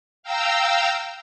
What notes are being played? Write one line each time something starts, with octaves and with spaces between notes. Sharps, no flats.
F5 G5 A#5 E6